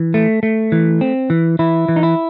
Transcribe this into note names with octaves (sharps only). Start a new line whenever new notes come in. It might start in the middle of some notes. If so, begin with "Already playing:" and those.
Already playing: E3
A3
A3
E3
C4
E3
E3 E4
E3
D#4
E4